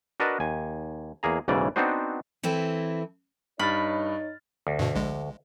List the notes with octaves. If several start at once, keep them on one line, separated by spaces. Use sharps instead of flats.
D4 F#4 A#4 B4 D#5 A5
D#2 G#5
E2 A#3 G#4 A#5
B1 G#2 C#3 E3 D5
B3 C4 D4 D#4 F#4 C5
E3 C4 E4 A4
G2 D#4 C#5 B5 F6 A6
D2
G2 B2
A#1 G#3